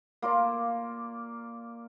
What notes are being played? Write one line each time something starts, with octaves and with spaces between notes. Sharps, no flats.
A#3 F4 A#4 D5